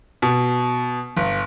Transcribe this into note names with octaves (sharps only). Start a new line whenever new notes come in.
B2
G1